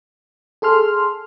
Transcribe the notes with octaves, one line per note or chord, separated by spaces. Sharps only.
G#4 A4 C6 F6